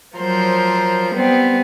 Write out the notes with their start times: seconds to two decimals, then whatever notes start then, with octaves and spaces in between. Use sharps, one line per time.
0.17 F3 F#3 A#4 C5
1.14 G3 B3 C4